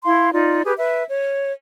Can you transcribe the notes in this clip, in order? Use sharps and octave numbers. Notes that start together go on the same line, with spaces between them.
E4 F5 C6
D#4 F4 D5
G4 G#4 B4
B4 E5
C#5